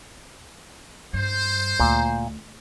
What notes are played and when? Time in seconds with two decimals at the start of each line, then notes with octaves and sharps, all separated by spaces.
1.13 G2 C5
1.80 D2 A#2